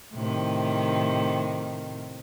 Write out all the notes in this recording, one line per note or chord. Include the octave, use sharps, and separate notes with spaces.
A2 C3 D#3